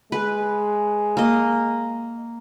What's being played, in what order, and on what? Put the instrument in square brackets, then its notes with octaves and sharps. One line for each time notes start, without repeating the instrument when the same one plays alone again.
[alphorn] G#3 [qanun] B4
[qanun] A#3 D#5